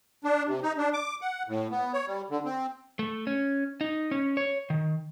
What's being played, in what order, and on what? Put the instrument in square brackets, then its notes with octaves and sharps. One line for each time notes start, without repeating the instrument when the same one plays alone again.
[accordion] D4
C3
D#4
D4
D6
F#5
A2
B3
C#5
G3
D3
C4
[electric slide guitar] A3
C#4
D#4
C#4
C#5
D#3